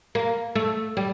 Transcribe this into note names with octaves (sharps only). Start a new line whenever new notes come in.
A#3
A3
G3